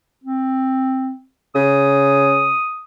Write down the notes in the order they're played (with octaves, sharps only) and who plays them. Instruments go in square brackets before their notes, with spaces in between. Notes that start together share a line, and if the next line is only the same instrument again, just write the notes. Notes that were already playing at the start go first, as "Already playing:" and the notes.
[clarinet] C4
[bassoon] C#3 [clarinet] D#6